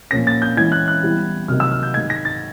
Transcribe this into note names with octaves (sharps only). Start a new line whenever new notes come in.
A#2 F3 A#3 C#4 A#6
A6
G6
E3 G#3 C#4 E4 G#6
F#6
F#6
E3 G3 B3 E4
C3 D#3 F#3 A#3 D#4 F6
E6
F6
G6
G#2 D#3 G#3 G#6
A#6
A6